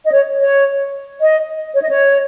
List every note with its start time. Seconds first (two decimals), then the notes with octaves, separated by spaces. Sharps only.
0.04 D#5
0.12 C#5
0.39 C#5
1.19 D#5
1.73 C#5
1.81 D#5
1.88 C#5